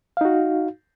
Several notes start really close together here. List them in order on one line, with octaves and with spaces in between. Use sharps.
F5 D#4 F#4